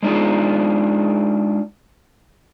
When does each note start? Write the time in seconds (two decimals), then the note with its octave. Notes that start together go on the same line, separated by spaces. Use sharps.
0.03 G#3 D4 D#4 F4 G#4